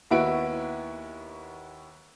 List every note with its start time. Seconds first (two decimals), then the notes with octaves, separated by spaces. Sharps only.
0.11 D#2 B3 E4 F#4 D7